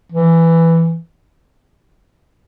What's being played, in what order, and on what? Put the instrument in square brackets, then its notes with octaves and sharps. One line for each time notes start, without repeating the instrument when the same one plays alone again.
[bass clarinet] E3